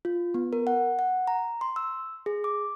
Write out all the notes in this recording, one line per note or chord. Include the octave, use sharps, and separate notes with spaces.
F4
B3
A#4
F#5
F#5
A#5
C6
E6
G#4
D6